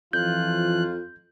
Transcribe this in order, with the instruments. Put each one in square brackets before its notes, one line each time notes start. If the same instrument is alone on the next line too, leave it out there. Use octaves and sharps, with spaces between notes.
[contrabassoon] F2 [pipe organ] E3 F3 F#6 [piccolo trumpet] F4 [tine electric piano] G6